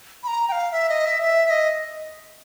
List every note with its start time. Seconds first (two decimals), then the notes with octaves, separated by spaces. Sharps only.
0.23 B5
0.27 A#5
0.49 G5
0.52 F5
0.72 E5
0.89 D#5
1.05 E5
1.22 E5
1.46 E5
1.50 D#5